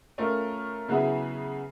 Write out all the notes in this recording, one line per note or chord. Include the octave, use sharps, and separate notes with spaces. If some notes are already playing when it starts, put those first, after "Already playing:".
A3 C#4 F4 A#4
C#3 F#3 B3 E4 G#4